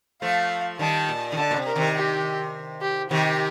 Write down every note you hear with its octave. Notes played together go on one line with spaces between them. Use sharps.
F3 A3 F5
D#3 G3 A5
A#2
D#3
D3 A5
A#2
C3
A#4
C3 D#3
G4
G4
C3 D#3 G4